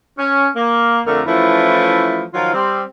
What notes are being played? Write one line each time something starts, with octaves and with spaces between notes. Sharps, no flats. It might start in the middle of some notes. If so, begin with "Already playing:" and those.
C#4
A#3
F2 D3 A3 A#4
E3 F3 A3 C#4 E4
D#3 F3 F#3 F4
G3 C4